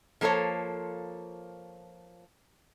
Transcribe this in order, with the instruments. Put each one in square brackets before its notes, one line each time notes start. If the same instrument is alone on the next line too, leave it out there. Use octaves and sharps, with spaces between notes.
[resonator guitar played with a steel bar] F3 A#3 A4 C5 C#5